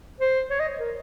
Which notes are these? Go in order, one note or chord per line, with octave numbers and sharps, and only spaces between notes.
C5
C#5
D#5
A#4